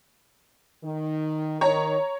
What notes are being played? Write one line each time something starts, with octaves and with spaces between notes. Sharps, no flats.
D#3
D#3 C#5 A#5